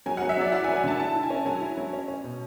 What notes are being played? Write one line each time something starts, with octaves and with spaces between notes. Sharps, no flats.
F#3 G#5
F#5
F#3
E5
F#3 D5
E4 F#5
G#5
F#3
G#5
D3 A5
E4 A5
E4
G#5
C#4
F#3 G#5
E4
F#3
C#4
C#4
B2